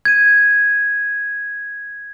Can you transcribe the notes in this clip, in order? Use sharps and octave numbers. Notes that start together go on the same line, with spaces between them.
G#6 D#7